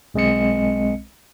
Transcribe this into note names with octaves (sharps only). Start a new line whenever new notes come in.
B1 G#3 C4 D#5 C#7